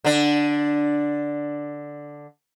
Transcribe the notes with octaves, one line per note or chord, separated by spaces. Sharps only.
D3 D4